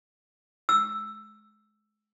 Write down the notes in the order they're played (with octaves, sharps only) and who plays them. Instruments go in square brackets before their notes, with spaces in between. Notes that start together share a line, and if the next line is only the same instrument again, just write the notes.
[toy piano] E6